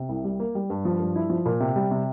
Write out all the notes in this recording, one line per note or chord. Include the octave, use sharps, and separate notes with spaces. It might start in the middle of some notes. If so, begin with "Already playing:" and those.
Already playing: C3
C2
G3
A#3
G3
G2
F3
G2
E4
F3
A#2
C3
G3
C3